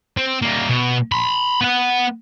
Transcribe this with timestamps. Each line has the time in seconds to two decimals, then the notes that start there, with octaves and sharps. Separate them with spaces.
0.17 C4
0.42 G3 A#3
0.69 B2
1.12 B5 C6
1.61 B3 F#5